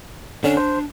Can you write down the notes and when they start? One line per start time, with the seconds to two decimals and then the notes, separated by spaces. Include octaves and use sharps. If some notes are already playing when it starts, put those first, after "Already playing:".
0.44 D3 C#4 D4
0.57 C5